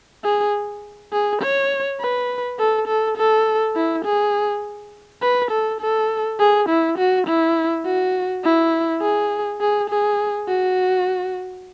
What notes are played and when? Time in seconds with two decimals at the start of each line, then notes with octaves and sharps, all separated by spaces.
0.24 G#4
1.13 G#4
1.42 C#5
2.00 B4
2.59 A4
2.87 A4
3.17 A4
3.75 E4
4.05 G#4
5.22 B4
5.51 A4
5.80 A4
6.39 G#4
6.69 E4
6.98 F#4
7.27 E4
7.85 F#4
8.44 E4
9.01 G#4
9.61 G#4
9.90 G#4
10.48 F#4